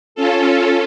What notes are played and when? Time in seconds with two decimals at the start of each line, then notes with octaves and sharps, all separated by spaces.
0.15 C#4 F4 A4